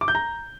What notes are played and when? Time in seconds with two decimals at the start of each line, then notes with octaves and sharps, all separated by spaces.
0.01 D6
0.08 G6
0.15 A#5